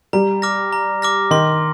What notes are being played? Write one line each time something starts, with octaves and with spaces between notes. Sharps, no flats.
G3 A#5
D6 F6 A#6
A#5
D6 F6 A#6
D#3 C6